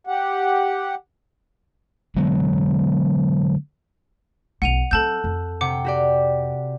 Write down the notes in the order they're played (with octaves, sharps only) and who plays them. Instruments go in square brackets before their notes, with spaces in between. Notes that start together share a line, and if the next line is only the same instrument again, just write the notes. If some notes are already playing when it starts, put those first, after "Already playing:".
[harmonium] G4 F#5
[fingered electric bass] D3 F#3 G#3 B3
[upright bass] B1 F3 [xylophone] F#5 D#7 F7
[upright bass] F#3 C4 [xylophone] A4 A5 G6 [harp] E6 F#6
[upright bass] F2
[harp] C3 G5 [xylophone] F#5 D6
[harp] F#4 G4 D5